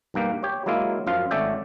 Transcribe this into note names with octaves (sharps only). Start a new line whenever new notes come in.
B1 G2 A#3 G4
G4 C#5
F#3 G#3 A#3 E4 F4
F#2 F3 F4 F5
G#1 A3 C#4 D5 E5 G5